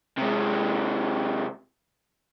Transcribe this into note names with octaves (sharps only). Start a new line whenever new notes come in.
C3 G#3